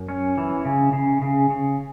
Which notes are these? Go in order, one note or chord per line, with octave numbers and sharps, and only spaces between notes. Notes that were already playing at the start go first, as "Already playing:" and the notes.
Already playing: F#2
C#4
E3
C#3
C#3
C#3
C#3